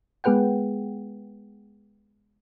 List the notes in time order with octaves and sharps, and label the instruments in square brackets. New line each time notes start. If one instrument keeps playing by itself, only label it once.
[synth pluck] G#3 B3 G#4 B4 F#5 G5